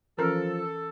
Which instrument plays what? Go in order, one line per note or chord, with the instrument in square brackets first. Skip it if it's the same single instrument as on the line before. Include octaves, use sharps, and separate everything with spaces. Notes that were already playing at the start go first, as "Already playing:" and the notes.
[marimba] E3 C#4 [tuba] F3 [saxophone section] A4 [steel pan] A#4